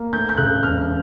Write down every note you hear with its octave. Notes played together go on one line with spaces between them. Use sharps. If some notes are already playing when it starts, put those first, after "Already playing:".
Already playing: A#3
D2 G6
G6
C#3 F#6
E1 F6